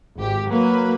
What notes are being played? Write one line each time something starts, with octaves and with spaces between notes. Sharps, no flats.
G#1 G4
F#3 A#3 B4